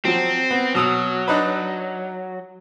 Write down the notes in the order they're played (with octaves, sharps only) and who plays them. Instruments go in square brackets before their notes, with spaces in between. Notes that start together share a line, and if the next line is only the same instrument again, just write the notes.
[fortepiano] F3 F#3 [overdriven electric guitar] C4
[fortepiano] B3
[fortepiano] B2 D#6 E6 [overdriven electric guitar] F#3
[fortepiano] D4 D#4 B4